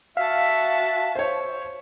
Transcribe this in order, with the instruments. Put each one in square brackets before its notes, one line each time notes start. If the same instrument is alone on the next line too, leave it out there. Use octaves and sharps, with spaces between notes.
[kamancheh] F#4 A5 [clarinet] E5 [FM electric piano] F5
[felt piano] C5 C#5